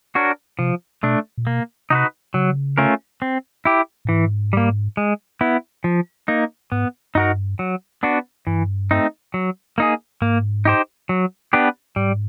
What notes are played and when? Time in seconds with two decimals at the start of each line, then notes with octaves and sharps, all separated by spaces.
0.15 D4 F#4 A#4 C#5
0.59 C3 F3
1.03 B2 A3 D4
1.38 A#2
1.47 B2 A#3
1.90 C3 D#4 F#4 B4
2.34 C#3 F#3
2.78 A3 C#4 F4 A#4
3.22 C4
3.65 E4 G4
4.05 A2
4.09 G#2 E3
4.53 G3 A#3
4.97 G#3
5.41 B3 E4
5.84 F3
6.28 A#3 D#4
6.72 G#2 B3
7.15 G2 D#4 F#4 A#4
7.59 F#3
8.03 B3 D4 F#4
8.47 G2 E3
8.91 A3 C4 D#4
9.34 F#3
9.78 A#3 D#4 G#4
10.21 G#2 A#3
10.65 D#4 G4 C5
11.09 F#3
11.53 B3 D4 G4 B4
11.96 G#2 G3